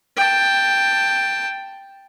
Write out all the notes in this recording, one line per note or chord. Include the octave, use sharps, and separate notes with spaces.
G5 A5